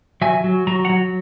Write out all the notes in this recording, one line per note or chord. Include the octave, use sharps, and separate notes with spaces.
F#3 E5 G#5
F#3
F#3 A#5
F#5 A#5
F#3